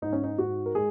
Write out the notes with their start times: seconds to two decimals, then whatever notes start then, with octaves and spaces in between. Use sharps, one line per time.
0.02 G#2 D#4
0.13 C#4
0.23 D#4
0.38 G#2 F#4
0.66 A#4
0.75 G#3 G#4